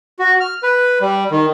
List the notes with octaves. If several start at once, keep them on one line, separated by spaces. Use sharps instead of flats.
F#4
F6
B4
G3
D#3